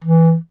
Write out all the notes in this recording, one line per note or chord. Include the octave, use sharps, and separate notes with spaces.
E3